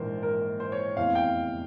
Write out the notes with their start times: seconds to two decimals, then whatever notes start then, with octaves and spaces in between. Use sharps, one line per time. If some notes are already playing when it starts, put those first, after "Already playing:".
Already playing: A#1 G#2 E3 A#4 C5
0.23 A#4
0.60 C5
0.72 C#5
0.97 F1 E2 C3 E3 F5
1.15 G5